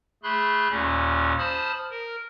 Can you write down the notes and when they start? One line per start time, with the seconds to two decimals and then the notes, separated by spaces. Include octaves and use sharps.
0.23 A3 G#4 B5 C6 F#6
0.70 D#2 A#2 C#4
1.38 C5 A5 B5 D#6 F6
1.91 A#4